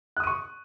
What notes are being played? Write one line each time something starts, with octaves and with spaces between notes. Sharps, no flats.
C#6 D#6 F#6 D#7